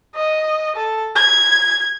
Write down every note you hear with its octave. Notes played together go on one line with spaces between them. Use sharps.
D#5
A4
G#6